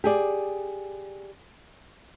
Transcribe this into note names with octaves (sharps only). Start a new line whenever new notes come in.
G4 G#4 D5